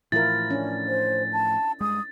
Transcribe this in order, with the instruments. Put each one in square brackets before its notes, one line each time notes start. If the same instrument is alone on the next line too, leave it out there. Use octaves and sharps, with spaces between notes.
[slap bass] A2 E3 F3 [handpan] E4 F4 A#4 [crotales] A6
[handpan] C#4 D4
[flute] C5
A5
[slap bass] G2 G#3 [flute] D#6